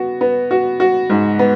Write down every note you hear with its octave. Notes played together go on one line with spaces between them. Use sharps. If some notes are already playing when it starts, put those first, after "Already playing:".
Already playing: B3 F#4
B3
F#4
F#4
G#2
B3